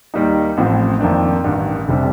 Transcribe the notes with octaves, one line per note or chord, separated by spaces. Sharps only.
D#2 D#3 G3 A#3 D#4
A1 A2 F3 C4
F2 D#3 A#3 D4
A1 G2 D#3
F1 C3 G3 D4